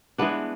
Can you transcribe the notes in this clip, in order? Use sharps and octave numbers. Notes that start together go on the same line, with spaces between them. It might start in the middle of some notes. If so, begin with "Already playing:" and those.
E3 G#3 B3 D4